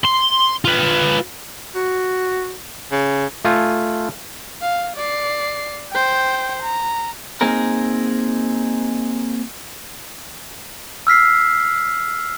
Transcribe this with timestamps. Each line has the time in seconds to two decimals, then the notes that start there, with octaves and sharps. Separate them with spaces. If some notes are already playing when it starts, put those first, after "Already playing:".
0.04 C6
0.65 F4 B4
1.75 F#4
2.92 C#3
3.45 A3 F4 G#5
4.62 F5
4.97 D5 C7
5.91 C5 G5
6.62 A#5
7.41 A#3 C4 D#4 G#4 A#4
11.07 E6 F6 B6 C7